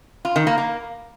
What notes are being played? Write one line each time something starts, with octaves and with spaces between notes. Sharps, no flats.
F4
D#3
A#3
A#3